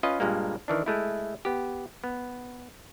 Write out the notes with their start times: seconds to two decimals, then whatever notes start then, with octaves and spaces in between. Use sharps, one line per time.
0.03 C#4 F4 B4 D#5
0.20 G2 A#2 G#3 A#3
0.68 D#3 E3 D4
0.86 G#3 A3 E4
1.45 B3 G4
2.04 B3